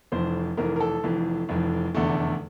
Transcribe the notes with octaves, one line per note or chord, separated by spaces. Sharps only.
F1 F2 E3 C5
F1 F2 E3 A#4
A#4
A4
F1 F2 E3
F1 F2 E3
F1 E2 D3 A3